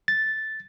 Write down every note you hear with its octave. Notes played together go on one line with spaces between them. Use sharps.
A6